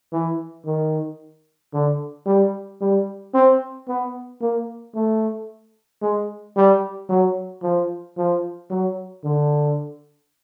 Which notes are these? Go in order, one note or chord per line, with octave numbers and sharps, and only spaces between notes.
E3
D#3
D3
G3
G3
C4
B3
A#3
A3
G#3
G3
F#3
F3
F3
F#3
D3